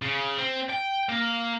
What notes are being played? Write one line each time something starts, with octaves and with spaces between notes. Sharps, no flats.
C#3
C4
G5
A#3